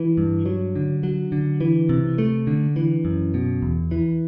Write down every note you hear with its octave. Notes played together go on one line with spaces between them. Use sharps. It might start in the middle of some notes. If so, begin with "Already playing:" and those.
Already playing: E3
G2
F#3
D3
F#3
D3
E3
C3
A3
D3
E3
F#2
B2
E2
E3